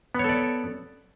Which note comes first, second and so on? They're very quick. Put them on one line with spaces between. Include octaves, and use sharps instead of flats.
B3 C#5 A4 D5